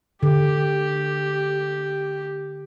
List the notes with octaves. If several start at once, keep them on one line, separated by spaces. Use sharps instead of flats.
D3 G4